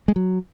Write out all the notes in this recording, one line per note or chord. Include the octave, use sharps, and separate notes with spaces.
G#3
F#3